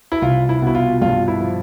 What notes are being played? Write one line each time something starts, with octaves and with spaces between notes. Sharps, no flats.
E4
C2 F4
E4
B2 E4
F4
G2 F4
E4
F3